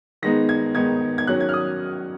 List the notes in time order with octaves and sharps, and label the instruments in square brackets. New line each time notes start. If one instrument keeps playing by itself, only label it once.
[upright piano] D#3 G#3 B3 D#4 A#6
G#6
D#3 G#3 B3 D#4 G#6
G#6
D#3 F#3 C#4 F#6
G#6
F6
D#6